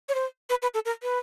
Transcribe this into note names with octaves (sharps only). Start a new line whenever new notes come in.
C#5
C5
B4
B4
A4
A#4
B4